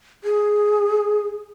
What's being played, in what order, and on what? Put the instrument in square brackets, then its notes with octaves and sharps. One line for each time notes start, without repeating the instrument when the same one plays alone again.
[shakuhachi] G#4